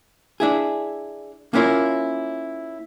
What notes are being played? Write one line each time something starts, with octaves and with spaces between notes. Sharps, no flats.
D4 E4 G#4
A#3 B3 C#4 E4 F4 A#4